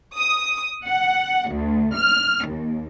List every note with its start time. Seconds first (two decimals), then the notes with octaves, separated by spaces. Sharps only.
0.16 D#6
0.85 F#5
1.51 D2
1.96 F6
2.46 D#2